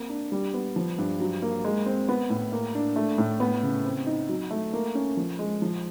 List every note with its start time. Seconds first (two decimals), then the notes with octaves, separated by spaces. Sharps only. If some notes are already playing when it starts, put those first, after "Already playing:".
Already playing: A#3 C4
0.09 D4
0.32 G3
0.54 B3
0.76 F3
0.98 G2
1.20 F#3
1.42 A#3
1.64 G#3
1.86 C4
2.09 B3
2.30 A2
2.52 A#3
2.75 D4
2.96 A3
3.18 A2
3.40 B3
3.63 C#3
3.85 C4
4.06 D#4
4.29 F#3
4.51 A3
4.73 A#3
4.95 C#4
5.17 F3
5.39 G#3
5.62 F3